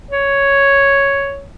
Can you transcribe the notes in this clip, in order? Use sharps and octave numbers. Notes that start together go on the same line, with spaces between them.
C#5